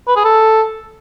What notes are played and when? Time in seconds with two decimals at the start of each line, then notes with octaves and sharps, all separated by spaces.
0.08 B4
0.16 G#4
0.25 A4